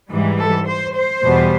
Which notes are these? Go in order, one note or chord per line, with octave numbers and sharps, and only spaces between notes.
G#2 E3 G3
A4
C5
C5
E2 B2 G3 B3